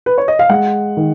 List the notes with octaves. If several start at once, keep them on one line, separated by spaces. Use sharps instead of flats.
B4
C#5
D#5
F5
G#3 F#5
D#3